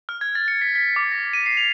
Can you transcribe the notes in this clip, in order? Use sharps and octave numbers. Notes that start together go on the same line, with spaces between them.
F6
G#6
A6
C#7
B6
B6
D6
A#6
D#7
C7
F7